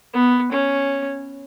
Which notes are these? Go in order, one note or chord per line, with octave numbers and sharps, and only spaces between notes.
B3
C#4